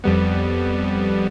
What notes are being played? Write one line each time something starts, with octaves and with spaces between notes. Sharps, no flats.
F2 G3 B3